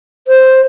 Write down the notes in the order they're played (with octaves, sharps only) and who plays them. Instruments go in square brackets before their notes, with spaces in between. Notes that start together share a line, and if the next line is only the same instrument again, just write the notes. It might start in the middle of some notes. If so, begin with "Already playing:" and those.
[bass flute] C5